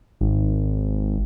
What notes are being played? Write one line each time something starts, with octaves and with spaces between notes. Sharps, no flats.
G#1